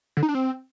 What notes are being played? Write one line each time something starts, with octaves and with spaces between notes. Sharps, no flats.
D3
D#4
D4
C4